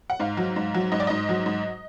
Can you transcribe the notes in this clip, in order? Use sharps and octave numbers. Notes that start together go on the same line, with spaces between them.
F#5
G#2 F5
F#3
G#2
F#3
G#2 D#5
D5
G#2 D#5
F#3
G#2